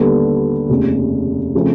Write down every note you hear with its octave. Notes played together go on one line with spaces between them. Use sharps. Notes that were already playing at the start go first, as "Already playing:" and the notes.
Already playing: D#2 D3 G3 B3
F1 D#2 C#3
C#3 F3 A3 C4